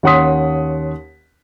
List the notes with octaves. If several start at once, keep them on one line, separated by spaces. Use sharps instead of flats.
D#2 C#4 F#5 C6 D#6 B6